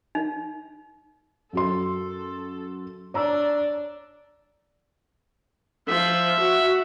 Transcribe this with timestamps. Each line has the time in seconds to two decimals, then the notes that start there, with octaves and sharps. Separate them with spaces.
0.15 D#4
1.53 F#2 F#4 A4 C6
3.14 D4 C#5 A#5 E6
5.88 F3 E5
6.41 F#4